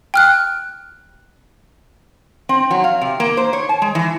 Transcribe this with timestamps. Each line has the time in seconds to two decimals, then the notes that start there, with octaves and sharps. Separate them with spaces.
0.14 G5 F6 F#6
2.49 C4
2.71 F#3
2.84 F5
3.01 C3
3.20 A#3
3.37 C5
3.53 C#5
3.69 A5
3.82 G#3
3.95 E3